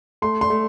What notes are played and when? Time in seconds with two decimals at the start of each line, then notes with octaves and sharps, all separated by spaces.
0.22 A3 C6
0.41 C6
0.50 A3